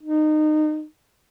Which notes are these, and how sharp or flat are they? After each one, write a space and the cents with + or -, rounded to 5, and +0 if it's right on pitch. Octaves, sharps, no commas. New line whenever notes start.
D#4 -25